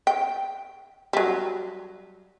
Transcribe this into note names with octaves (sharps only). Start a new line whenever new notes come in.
G5
F#3 G3